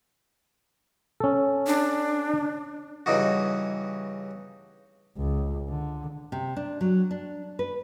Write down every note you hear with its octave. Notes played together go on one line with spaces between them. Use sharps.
C#4 A4
D4
G2 C#3 E3 D#4 F#4
C#2
D3
C3
D4
F#3
D4
B4